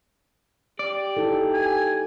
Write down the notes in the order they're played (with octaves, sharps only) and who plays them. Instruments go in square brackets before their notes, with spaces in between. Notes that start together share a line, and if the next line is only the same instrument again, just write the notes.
[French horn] G4 [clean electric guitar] D5
[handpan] D#4 E4 A4
[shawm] G#5